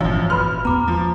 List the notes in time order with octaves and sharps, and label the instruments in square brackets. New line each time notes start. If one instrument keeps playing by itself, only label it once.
[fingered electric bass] G#1 A#2 E3 [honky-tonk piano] F#2 F3 [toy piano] F5
[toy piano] F#4 B4 B5 [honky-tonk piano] F6
[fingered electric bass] E2 B3 [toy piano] A#5 D6
[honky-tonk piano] F3